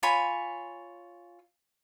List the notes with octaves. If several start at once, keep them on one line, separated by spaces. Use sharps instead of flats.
F4 C#5 G#5 B5